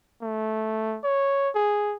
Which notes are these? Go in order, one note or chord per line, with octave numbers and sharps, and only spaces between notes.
A3
C#5
G#4